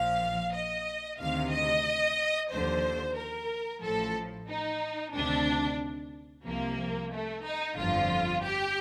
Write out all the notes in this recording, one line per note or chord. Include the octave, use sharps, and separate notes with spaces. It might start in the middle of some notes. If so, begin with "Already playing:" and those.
Already playing: A#1 A#2 F3 F5
D#5
D2 C3 D#3 F5
D#5
D#2 D3 F3 C5
A#4
A1 A2 F3 A4
D#4
D2 C3 D#3 D4
C2 C3 F3 A#3
A3
D#4
G1 F2 D3 F3 F4
G4